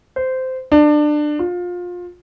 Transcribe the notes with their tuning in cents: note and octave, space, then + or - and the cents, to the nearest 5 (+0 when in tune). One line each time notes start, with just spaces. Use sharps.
C5 -15
D4 +25
F4 +25